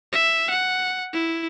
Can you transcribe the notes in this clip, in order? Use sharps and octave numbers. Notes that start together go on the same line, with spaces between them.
E5
F#5
E4